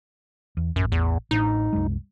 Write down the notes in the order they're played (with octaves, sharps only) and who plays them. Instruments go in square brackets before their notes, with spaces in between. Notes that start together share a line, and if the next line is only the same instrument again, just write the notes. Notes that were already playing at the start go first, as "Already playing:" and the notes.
[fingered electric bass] E2
[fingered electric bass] A1 [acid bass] F#2
[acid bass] E2
[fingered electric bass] A1 A2 D4 [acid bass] D#4
[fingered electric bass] C2 F#2 G#3